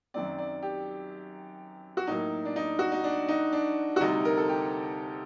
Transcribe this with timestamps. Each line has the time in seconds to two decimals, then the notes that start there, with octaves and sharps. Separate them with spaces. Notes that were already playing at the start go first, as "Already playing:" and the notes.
0.14 F#2 D#3 F#3 C4 D5
0.38 D5
0.62 G4
1.97 F#4
2.07 A2 F#3 A#3 D#4
2.45 D4
2.56 D#4
2.79 F#4
2.92 D#4
3.04 D4
3.28 D#4
3.52 D4
3.96 F#4
4.00 D2 C3 G3 D#4
4.25 A#4
4.37 A4
4.49 G4